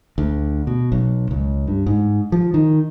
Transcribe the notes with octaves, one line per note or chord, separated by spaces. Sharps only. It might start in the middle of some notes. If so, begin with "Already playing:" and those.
D2
B2
B1
C#2
G2
G#2
F3
D#3